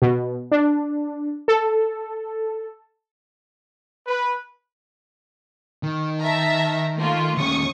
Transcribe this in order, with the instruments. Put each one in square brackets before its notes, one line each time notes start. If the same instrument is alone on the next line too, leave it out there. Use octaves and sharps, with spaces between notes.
[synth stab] B2
D4
A4
[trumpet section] B4
[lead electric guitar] D#3
[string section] E5 A5 A#5
A3 A#3 F4
[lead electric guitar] D#2 C#4 [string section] C#6 D#6